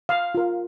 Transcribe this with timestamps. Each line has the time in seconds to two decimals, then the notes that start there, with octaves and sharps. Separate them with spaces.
0.09 F5
0.35 F4 A#4